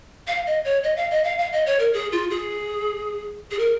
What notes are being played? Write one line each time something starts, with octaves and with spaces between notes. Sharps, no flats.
F5
D#5
C#5
D#5
F5
D#5
F5
F5
D#5
C#5
A#4
G#4
F4
G#4
G#4
A#4